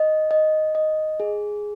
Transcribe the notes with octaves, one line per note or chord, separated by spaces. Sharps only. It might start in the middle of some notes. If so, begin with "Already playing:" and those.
Already playing: D#5
D#5
D#5
G#4